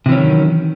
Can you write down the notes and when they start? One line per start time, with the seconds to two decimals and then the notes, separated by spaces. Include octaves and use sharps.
0.06 C3
0.09 E3
0.12 C#4
0.15 F#3
0.17 D#3